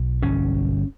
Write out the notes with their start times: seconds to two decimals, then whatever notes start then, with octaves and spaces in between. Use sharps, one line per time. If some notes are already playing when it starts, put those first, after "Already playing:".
Already playing: B1
0.22 G1 C#4